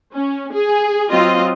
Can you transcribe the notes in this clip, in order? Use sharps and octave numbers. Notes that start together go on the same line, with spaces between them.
C#4
G#4
F#3 C4 F4 D#5